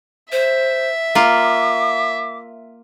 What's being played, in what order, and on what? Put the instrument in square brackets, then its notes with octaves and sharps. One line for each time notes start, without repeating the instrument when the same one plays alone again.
[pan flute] C5 [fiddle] E5
[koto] A#3 F4 [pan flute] D6